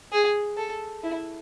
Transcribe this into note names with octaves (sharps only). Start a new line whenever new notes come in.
G#4
A4
E4